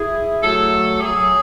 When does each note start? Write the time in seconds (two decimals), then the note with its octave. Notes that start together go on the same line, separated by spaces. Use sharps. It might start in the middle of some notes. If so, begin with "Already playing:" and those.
Already playing: E4 G#4
0.43 F#3 A3 A4
1.01 F#3 G#4